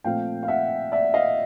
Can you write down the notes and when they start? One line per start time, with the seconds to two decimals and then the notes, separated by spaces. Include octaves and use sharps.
0.04 A#2 F3 A3 C4 F5 G5
0.43 F5
0.48 E5 F#5
0.92 D5 E5
1.14 D#5 F5